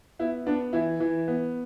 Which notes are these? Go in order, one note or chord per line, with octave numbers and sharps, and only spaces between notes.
B3 E4
B3 D4
E3 E4
E3
B3